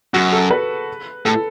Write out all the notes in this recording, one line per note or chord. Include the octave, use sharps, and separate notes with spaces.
F#2 F#4
A4
B4
A2 A4